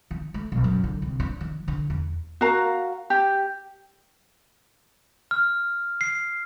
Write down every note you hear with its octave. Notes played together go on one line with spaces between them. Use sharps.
D#3
A3
B1
F#2
D3
C2
D4
D#3
D3
E2
F#4 A#4 F5 A#5
G4
F6
C7